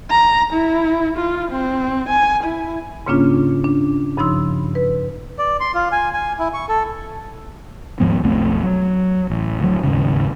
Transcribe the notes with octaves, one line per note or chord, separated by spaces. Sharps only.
A#5
E4
F4
C4
G#5
E4
G#2 C#3 A#3 C#4 D4 F4
D4
G2 C#3 F3 D#4 C6 E6
B4
D5
C6
F4
G#5
G#5
E4
C#6
A4
D#2 G#2 F3 B3
B1 F2 A3 C4
F#3
A1
D2 F#3
D#2 G#2 C#3